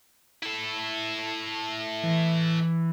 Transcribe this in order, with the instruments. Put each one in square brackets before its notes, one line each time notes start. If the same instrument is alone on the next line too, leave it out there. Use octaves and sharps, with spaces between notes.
[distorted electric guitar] E4 A4
[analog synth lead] E3